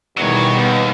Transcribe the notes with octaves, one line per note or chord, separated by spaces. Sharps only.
E2 B2 D#3 F#3 G3 C#5
D#2 B3